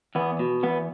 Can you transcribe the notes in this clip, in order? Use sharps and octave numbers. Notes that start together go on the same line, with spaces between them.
E2 B3
B2
E2 B3